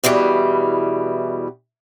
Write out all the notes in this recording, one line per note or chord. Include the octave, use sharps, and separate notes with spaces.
E2 B2 E3 G3